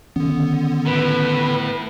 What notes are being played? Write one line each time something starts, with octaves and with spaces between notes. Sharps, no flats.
D3 D#3 B3 C#4
A2 B4